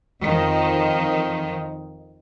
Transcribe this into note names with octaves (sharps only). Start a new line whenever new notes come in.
F2 D#3 F3